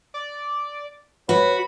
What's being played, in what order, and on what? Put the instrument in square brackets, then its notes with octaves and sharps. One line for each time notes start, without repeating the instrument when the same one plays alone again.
[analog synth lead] D5
[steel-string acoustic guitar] F#4 [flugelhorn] B4 [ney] C#5 [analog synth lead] B5